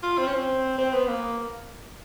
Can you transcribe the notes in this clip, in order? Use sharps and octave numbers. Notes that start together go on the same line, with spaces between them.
F4
C4
C#4
C4
C4
B3
A#3